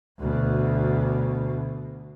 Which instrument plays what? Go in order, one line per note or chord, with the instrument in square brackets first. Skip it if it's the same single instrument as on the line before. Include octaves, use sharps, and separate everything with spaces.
[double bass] D2 B2